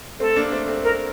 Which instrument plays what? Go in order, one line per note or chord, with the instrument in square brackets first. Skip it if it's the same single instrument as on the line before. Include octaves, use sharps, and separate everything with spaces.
[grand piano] A3 C4 [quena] A4
[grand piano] A#3 D4
A3 C4
A3 C4
[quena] A#4